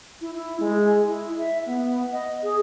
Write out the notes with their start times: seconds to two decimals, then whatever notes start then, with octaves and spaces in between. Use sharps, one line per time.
0.21 E4
0.35 E4
0.60 G#3
1.07 E4
1.38 E5
1.66 B3
2.12 D#5
2.43 G#4